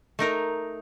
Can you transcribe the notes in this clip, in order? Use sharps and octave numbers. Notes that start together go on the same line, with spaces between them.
A3 D#4 A#4